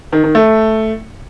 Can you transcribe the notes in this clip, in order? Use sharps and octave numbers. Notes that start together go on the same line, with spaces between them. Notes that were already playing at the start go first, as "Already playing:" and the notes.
D#3
D#3
A3